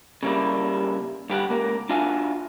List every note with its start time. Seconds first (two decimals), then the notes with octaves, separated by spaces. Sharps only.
0.23 C#3 G3 A#3 E4
1.30 G2 G4 A#4 F#5
1.49 C#2 A#3 A#4
1.89 D4 F4 F#4 E5 F5 G#5